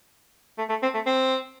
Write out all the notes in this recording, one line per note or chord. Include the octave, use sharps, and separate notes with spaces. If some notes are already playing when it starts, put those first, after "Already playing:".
A3
A3
C4
A3
C4